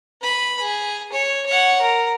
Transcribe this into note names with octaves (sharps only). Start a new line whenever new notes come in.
B4 B5
G#4
C#5
C#5 F#5
A#4